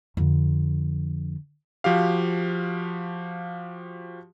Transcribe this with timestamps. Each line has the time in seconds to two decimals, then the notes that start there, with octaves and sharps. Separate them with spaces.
0.17 F2 D3
1.84 F3 F#4 G4 F5